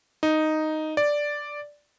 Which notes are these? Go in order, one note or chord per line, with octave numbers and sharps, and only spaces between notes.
D#4
D5